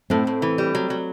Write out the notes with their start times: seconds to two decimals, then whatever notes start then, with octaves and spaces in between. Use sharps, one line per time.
0.10 A2 A3 C4
0.27 A2
0.42 E3
0.58 G3
0.75 F#3
0.90 F#3